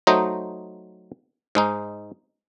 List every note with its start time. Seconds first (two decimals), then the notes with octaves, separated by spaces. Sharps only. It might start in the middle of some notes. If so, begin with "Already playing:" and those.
0.07 F#3 A3 D#4 C5 D#5
1.55 G#2 G#3 D#4